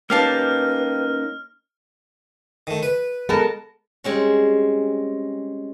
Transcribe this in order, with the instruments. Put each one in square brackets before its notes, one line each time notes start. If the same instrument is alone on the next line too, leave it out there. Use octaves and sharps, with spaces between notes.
[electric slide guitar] A#3 C#4 D#4 [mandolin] G4 F5 A5 [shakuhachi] B4 [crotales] F6
[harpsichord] D#3 A3
B4
[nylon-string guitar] G#3 A4 [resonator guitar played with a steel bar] B3 A#4 A5
[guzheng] G3 G#3 C4 C#4